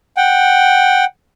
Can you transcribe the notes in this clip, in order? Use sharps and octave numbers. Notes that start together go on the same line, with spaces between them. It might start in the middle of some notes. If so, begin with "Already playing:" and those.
F#5 G5